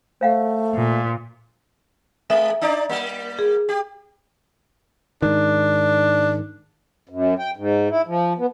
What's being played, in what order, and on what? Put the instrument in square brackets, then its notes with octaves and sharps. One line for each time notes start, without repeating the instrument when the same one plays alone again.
[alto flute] A3 [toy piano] C5 F5 F#5
[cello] A#2
[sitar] G#3 [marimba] E5
[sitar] D4 D#4 D5
G3 A#3
[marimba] G#4
[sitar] G4
[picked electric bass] G#2 D#3 [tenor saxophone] D4
[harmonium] F#2
G5
G#2
E4
F3
B3